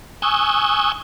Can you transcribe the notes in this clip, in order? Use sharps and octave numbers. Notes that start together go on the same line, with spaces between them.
G#5 C#6 D#6 E6 F#6 G6